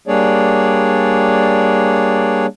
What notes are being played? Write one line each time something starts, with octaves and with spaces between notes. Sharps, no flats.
G3 A#3 D4 G#4 C#5 D5